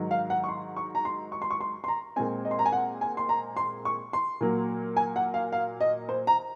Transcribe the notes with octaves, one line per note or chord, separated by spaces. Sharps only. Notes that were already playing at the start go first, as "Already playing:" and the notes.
Already playing: G#2 D#3 F#3
F5
F#5
C#6
C6
C#6
A#5
C6
C#6
C6
C#6
C6
C6
A#5
A#2 G#3 C4 G#5
D#5
C6
A#5
G#5
F#5
G#5
C6
A#5
C6
C#6
C6
A#2 F#3 A#3
G#5
F#5
F5
F5
D#5
C5
A#5